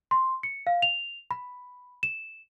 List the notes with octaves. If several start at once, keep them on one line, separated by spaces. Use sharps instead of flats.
C6
C#7
F5
F7
B5
E7